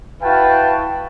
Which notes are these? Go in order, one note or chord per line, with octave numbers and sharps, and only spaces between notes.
E4 F#4 B4 F5 G5 A5